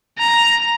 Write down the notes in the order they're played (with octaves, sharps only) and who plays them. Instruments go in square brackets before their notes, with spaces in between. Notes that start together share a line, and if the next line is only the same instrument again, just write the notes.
[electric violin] A#5